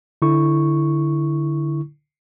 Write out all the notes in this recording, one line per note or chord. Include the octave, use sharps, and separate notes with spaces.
D3 E4 C#6